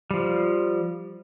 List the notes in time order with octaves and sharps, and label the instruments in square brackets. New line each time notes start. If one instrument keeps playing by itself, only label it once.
[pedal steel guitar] F3 G3